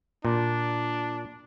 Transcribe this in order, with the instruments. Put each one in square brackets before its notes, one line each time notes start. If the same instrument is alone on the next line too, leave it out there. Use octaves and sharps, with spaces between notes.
[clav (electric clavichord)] A#2 [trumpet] D4